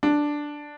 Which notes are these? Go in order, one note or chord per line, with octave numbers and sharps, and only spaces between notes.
D4